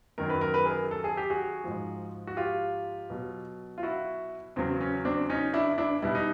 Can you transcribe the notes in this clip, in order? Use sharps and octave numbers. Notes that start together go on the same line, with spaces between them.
F#2 D#3 F#3 A#4
B4
A#4
B4
G#4 A#4
A4
G#4
G4
F#4 G#4
G#2 F3
F#4
F4 G4
B2 F#3
F4
E4 F#4
E2 C#3 F#3 C4
C#4
C4 D4
C#4 D#4
D4 E4
D4 E4
B2 G3 E4
D#4